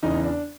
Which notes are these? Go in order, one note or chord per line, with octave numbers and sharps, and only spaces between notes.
E2 C#3 E3 D#4
D4